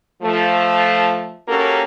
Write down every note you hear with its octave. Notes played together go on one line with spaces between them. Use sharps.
F3 A3
A#3 C#4 F#4 G4 A4 A#4